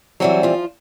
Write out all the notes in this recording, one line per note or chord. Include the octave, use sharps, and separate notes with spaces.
E3 F#3 G3 C4 F#4
F3 F4